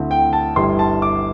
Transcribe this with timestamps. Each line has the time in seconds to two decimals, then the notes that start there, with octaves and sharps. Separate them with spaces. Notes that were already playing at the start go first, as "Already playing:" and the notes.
Already playing: D2 D3 C4 E4
0.11 G5
0.33 A5
0.56 G1 G2 G3 E4 C6
0.79 A5
1.02 D6